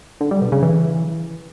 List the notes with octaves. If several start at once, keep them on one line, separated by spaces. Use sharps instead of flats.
D3
G3
B2
C#3
E3